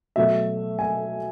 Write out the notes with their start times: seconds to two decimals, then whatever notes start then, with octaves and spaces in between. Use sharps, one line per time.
0.16 B2 F#3 A3 E5
0.79 G#5